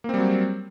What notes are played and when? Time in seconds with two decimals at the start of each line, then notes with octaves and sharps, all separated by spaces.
0.04 A#3
0.09 C4
0.14 G3
0.18 F#3